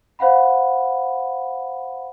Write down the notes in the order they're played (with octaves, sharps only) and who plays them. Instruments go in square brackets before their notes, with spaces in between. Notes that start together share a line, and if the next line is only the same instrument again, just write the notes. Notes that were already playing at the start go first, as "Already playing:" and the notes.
[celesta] C5 F5 F#5 B5